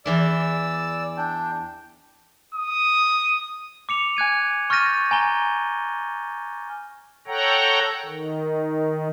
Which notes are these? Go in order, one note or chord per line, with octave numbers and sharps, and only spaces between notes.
E2 E3 E4 D5 E6
D4 G5
D#6
D6 C#7 F7
G#5 F#6 G#6 D#7
C#6 F6 G6 A6 A#6 D#7
G#5 A#5 G7
A4 C#5 F#5 G5 A#5
D#3